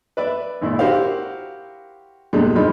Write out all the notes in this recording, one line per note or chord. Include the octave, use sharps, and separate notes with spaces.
B4 D5 E5
G#1 A#2 E4
E4 F#4 G4 A#4 C5 F5
E2 A#2 D3 G3 G#3
F3 G3 G#3 D#4 B5